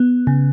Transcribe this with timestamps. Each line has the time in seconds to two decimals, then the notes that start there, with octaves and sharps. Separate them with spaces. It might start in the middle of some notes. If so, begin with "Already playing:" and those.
Already playing: B3
0.27 C#3